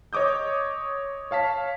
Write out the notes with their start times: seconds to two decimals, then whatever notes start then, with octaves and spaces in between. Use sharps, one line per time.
0.13 C#5 D#5 D6 D#6 G6
1.31 C#5 F5 A5 B6